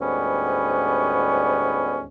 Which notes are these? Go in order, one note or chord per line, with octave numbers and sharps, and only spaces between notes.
D2 G#2 G3 B3 C#4